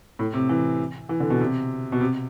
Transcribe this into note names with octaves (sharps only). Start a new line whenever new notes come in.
A2
C3
E3
E3
D3
B2
C3
B2
C3